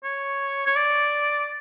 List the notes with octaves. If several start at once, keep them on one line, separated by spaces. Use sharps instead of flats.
C#5
C#5
D5